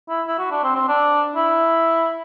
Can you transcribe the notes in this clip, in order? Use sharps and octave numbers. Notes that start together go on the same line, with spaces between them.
E4
E4
F#4
D4
C4
C4
D4
E4